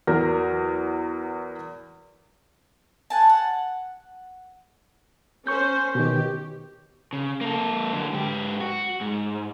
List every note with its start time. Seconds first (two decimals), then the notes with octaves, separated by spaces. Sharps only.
0.07 E2 F#3 A#4
3.10 F#5 G#5 A5
3.29 F#5
5.47 C#4 C5 C#6 G6
5.95 B2 D#3 G4
7.13 C#3
7.41 A#3 A4
7.93 D3 F#3
8.13 G#2 G4
8.61 F#4
9.01 G#2